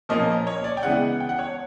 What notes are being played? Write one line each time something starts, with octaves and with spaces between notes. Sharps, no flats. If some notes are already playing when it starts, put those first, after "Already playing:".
A#2 F3 A#3 C#4 D#5
C#5
D5
G5
C#3 E3 G#3 B3 F#5
G5
F#5
C#5